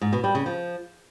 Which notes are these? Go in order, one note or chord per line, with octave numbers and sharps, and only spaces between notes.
G#2
B2
G3
C#3
F3